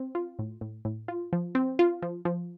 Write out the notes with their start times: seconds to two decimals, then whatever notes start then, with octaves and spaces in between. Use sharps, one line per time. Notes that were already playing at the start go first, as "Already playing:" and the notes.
Already playing: C4
0.15 F4
0.39 A2
0.61 A2
0.85 A2
1.08 F4
1.33 F3
1.55 C4
1.79 F4
2.02 F3
2.25 F3